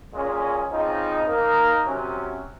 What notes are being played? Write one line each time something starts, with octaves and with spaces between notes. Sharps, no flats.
A#2 G#3 C#4
C#3 F3 C4 D#4
A#3 D#4 A#4
C3 F#3 C#4